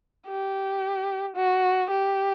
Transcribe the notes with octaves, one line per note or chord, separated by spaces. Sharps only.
G4
F#4
G4